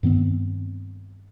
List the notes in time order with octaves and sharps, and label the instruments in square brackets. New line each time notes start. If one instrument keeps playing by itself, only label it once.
[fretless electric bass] G2 D#3 B3 C4